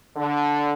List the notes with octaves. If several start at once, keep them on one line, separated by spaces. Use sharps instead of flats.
D3